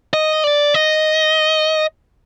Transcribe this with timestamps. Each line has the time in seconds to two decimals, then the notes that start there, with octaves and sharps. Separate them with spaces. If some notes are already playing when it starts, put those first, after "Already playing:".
0.13 D#5
0.44 D5
0.74 D#5